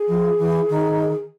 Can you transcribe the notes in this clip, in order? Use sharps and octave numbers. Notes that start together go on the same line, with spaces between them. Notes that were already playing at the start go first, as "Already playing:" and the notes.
Already playing: G#4
F3
E3
D#3